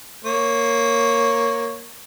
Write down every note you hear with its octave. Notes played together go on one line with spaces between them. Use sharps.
A#3 C#5